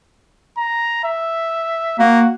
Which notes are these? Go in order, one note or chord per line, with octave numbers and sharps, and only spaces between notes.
A#5
E5
A#3 F#4